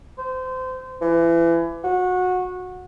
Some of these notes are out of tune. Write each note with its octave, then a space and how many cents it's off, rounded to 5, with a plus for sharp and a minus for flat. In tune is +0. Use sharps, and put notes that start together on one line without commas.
C5 -25
E3 +30
F#4 -20